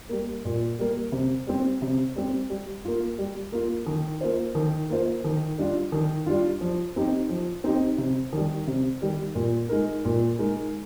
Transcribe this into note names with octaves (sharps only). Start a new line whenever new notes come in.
G3 A#3
A#2
G3 A#3
C3
G3 C4
C3
G3 C4
G3
A#3 F4
G3
A#3 F4
D#3
A#3 F4 C5
D#3
A#3 F4 C5
D#3
G3 D4 F4
D#3
G3 D4 F4
F3
C4 D#4 G4
F3
C4 D#4 G4
C3
D#3 G3
C3
D#3 G3
A#2
G#3 D#4 A#4
A#2
G#3 D#4 A#4